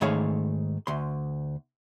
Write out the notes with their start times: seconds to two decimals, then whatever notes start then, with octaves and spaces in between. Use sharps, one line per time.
0.01 G#2 D#3 A3 G#4 C#5 F5
0.87 D2 C6